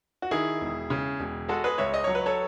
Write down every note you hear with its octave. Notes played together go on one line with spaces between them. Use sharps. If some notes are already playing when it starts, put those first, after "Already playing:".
F#4
D#3 E4 G#4
E1
C#3
E1
G#3 F#4 A4
G#4 B4
C#2 C#5 E5
D#5
F#3 C#5
B4
A4 C#5